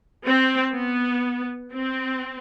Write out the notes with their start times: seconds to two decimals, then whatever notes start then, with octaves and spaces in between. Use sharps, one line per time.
0.26 C4
0.74 B3
1.72 C4